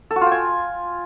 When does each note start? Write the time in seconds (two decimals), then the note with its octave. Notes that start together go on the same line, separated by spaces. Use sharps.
0.11 A4
0.16 F#4
0.21 F4
0.26 G5
0.32 G#5